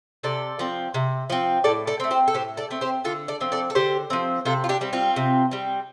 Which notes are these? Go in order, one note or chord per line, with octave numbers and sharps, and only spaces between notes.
C3 A4 D5
F3 C4
C3
F3 C4
A2 A4 D5
A4 D5
A3 C4
G4 C5
A4
A2 G4 C5
A4 D5
A3 C4
G4 C5
D3 F4 A4
A4 D5
F3 C4
A4 D5
A4
D3 G4 C5
F3 C4
C3 F4 A4
F4
D4 G4
G3 C4
C4 F4
C3
G3 C4